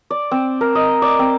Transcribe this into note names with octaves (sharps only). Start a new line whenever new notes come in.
D5
C4
A#4
D#5
D5
C4